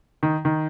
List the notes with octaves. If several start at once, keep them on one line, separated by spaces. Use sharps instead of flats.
D#3
D#3